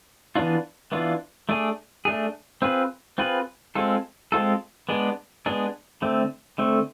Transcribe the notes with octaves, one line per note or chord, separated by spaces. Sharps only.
E3 B3 D4 F4
E3 B3 D4 F4
A3 D4 G#4
A3 D4 G#4
C4 F4 G#4 B4
C4 F4 G#4 B4
G#3 C4 F4 A4
G#3 C4 F4 A4
G#3 B3 D4 G#4
G#3 B3 D4 G#4
D3 A3 C4
D3 A3 C4